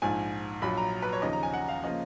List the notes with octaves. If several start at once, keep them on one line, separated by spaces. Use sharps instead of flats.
A#1 G#2 F3 G#5
A#1 A#2 F#3 B5
A#5
B4
C#5
D#2 C#3 F3 D#5
A#5
G#5
F#5
F5
C#3 F3 A#3 F4 D#5